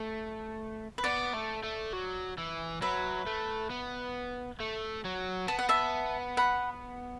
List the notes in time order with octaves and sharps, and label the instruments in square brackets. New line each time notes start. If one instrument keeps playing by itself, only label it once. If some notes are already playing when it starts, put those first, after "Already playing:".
Already playing: [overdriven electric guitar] A3
[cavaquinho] B4
[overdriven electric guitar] B3 [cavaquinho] D5
[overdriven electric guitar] A3
A3
F#3
E3
[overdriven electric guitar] F#3 [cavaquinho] B4 E5
[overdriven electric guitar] A3
B3
A3
F#3
[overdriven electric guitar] B3 [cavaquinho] A5
[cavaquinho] F#5
E5 A5
F#5 B5